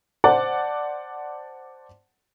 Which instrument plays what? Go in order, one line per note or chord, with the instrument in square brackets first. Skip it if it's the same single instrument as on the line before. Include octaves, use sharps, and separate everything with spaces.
[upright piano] C5 D5 F#5 A5